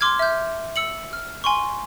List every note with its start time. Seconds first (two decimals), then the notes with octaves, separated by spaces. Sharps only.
0.01 C6 D6 F6 G#6
0.19 E5 F6 G6
0.76 E6 C#7 F#7
1.13 F6
1.44 G#5 C6 C#6